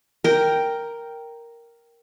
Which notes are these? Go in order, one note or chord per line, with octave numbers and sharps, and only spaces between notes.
A#4 G5